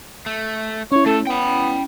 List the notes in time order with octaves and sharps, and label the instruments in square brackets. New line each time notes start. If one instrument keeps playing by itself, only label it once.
[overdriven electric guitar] A3
[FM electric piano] C#4 E4 [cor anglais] C#5
[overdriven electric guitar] A3 [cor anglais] A4
[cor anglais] B3 [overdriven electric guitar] G5 B5